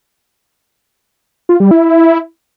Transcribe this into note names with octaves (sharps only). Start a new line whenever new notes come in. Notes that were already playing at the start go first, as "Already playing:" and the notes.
F4
G3
E4